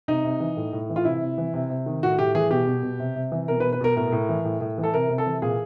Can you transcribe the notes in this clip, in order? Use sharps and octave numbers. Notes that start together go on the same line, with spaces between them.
C3 D#4
C3
E3
A2
A2
E3
F4
C3 E4
C3
E3
C3
C3
D#3
A2 F#4
A2 G4
E3 G#4
B2 G4
B2
B2
C3
C3
E3
B2 A#4
B4
B2
B4
B2 A#4
A2 A#4
A2
E3
A2
A2
E3
A4
C3 A#4
C3
A4
E3
A#2 G#4